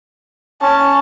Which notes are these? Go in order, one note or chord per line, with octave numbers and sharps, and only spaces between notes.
C#4 A5